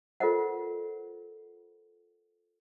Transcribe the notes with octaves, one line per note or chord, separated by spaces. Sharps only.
F4 A4 A#4 C5 D#5 F#5